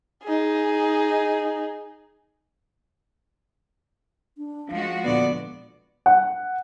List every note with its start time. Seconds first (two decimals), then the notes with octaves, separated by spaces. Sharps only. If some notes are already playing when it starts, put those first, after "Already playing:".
0.24 D#4 G#4
4.38 D4
4.71 F3 G#3 C#4 F#4 F5
5.04 D#2 A#2 D3 B3 D5
6.06 F#5